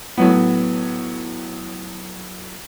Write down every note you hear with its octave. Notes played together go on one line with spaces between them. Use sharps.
A2 F#3 B3